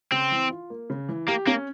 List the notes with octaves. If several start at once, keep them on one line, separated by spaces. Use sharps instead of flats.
C#3 C4
E3
F4
A#3
C#3
E3
A#3 G4
A#3 C#4